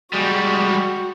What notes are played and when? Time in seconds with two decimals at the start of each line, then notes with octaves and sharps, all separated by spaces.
0.14 G3 G#3 F#4